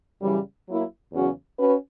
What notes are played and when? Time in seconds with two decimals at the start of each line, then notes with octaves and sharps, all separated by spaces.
0.22 F#2 C#3 E3 G3
0.67 F#3 A#3 E4
1.13 E2 C#3 F#3 C#4 F#4
1.58 C#4 F#4 B4